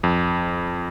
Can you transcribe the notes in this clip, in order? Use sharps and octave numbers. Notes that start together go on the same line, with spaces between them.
F2